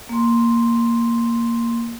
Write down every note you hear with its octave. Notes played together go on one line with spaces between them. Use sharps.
A#3 C6